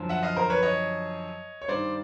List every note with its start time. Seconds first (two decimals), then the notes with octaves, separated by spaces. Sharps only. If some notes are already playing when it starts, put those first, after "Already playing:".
Already playing: F#2 D3 F3
0.09 E5 F#5
0.23 D#5 F5
0.36 A#4 C5
0.50 B4 C#5
0.63 C#5 D#5
1.62 C#5
1.68 G2 D#3 C5 D5